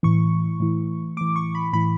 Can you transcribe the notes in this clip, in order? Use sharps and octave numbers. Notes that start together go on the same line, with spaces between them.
A2 E3 C#6
A2 E3
A2 E3 D6
C#6
B5
A2 E3 B5